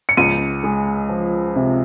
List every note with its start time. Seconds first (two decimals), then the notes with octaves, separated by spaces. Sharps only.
0.09 C#7
0.17 C#2 D#7
0.63 G#3
1.09 F3
1.56 C3